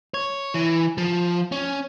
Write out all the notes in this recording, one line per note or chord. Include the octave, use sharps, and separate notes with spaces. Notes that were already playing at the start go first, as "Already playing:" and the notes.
C#5
E3
F3
C#4